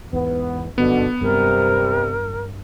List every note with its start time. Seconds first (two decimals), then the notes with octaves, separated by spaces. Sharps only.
0.13 E2 G#2 B3
0.78 G1 F#2 B2 D3 B3
1.21 G2 C3 F#3 G3 A#4